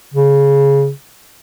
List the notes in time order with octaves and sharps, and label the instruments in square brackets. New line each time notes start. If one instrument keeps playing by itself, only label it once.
[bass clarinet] C#3